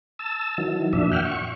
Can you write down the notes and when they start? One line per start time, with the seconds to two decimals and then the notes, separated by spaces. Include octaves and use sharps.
0.19 A5 E6
0.58 D#3 E3 F#3
0.93 F2 A#2 D4 E5
1.12 E5 F#5 G5 F6
1.25 C#6